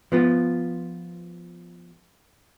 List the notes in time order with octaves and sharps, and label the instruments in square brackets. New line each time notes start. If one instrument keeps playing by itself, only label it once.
[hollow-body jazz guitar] F3 B3 F4